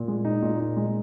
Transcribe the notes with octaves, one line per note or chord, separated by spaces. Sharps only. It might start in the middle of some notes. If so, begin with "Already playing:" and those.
Already playing: A#2
G#3
D#4
A#2
D#4
G#3